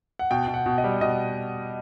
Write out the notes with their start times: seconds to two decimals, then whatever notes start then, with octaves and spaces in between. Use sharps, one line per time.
0.19 F#5
0.31 B2 G5
0.48 B2
0.54 F#5
0.66 B2
0.78 D#5
0.84 G3
1.01 B2 D#5